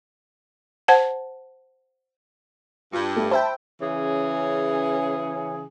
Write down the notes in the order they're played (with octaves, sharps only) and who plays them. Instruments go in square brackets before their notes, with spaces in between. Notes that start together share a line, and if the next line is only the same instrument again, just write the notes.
[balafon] C5 F#5 A5
[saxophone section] G2 [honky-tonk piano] F4
[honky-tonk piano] A3
[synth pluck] C5 E5 G5 [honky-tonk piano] A5 B5
[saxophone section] C#3 E3 C#4 G#4